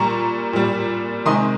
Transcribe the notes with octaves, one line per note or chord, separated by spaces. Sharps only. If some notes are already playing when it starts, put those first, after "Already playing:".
Already playing: A#2 G3 A#5 C#6
A#2 G3
C3 D#3 G#3 C6 D#6